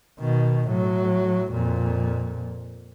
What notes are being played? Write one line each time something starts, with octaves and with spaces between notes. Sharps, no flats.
B2 D#3
A2 F#3
F2 A#2